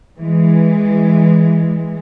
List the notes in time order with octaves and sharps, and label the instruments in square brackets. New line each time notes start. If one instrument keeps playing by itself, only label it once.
[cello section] E3 G#3